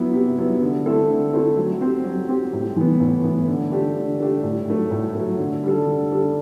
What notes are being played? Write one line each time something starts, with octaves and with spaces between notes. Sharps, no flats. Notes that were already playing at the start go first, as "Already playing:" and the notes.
Already playing: F#3 B3 E4
C3
F#3 B3 E4
D3
A3 C4 E4 A4
D3
A3 C4 E4 A4
F#3
C4 G4
F#3
C4 G4
A2
E3 B3
A2
E3 B3
D3
A3 D4 G4
D3
A3 D4 G4
A2
F#3 A3
A2
F#3 A3
D3
G3 D4 A4
D3
G3 D4 A4